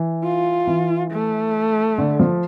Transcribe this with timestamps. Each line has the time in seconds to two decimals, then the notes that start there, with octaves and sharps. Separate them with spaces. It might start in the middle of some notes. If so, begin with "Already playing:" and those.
Already playing: E3
0.24 F4
0.67 E3
1.11 A3
1.98 D3
2.20 F3